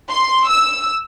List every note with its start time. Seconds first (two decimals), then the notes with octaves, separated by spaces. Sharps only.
0.09 C6
0.47 E6